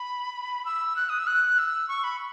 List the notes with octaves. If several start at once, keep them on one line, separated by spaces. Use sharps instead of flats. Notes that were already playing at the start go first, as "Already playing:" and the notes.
Already playing: B5
E6
F#6
D#6
E6
F#6
E6
C#6
B5